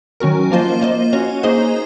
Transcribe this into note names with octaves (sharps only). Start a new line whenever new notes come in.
D#3 F#3 C#4 F#4 A#4
F3 A#3 F4 C5 D#5
A#3 F4 C5 D#5
C#4 F#4 C#5
A#3 D#4 G#4 C5 D#5